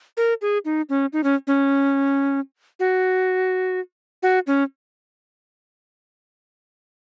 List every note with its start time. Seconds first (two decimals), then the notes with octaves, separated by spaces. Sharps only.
0.17 A#4
0.42 G#4
0.65 D#4
0.89 C#4
1.13 D#4
1.24 C#4
1.47 C#4
2.80 F#4
4.23 F#4
4.47 C#4